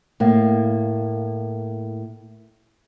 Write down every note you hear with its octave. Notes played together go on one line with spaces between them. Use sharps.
A2 A#3